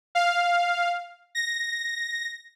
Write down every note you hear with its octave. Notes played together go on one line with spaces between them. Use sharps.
F5
A#6